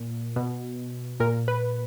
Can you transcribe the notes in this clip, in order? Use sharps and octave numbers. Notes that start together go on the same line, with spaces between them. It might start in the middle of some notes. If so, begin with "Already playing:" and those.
Already playing: A#2
B2
A#2 A#4
B4